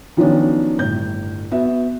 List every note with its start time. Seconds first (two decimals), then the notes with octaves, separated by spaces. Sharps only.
0.17 D#3 F3 F#3 B3 C#4 D4
0.78 G1 A2 G6
1.51 B3 F#4 E5